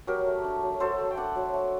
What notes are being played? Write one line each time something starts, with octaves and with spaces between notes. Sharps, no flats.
F#3 G4 A#4
A3
D4
F#3
F#3 A4 C5
A3
G5
D4 D5 F#5
F#3
A3